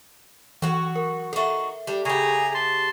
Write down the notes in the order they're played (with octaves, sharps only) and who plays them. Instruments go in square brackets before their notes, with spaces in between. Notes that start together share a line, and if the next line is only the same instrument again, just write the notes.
[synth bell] E3 [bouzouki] F#3 F#4
[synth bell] A#4
[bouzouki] D#4 F#4 [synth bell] A4 E5
[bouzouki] G3 D4
[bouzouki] C#3 G4 [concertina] G#4 G#5 A#5
[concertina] A5 C6